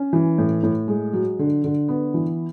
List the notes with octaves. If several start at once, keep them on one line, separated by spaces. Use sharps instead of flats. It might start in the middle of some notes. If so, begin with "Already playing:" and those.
Already playing: C#4
E3
A2
A2
G#3
F#3
D3
D3
B3
E3